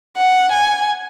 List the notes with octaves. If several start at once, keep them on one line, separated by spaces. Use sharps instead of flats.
F#5
G#5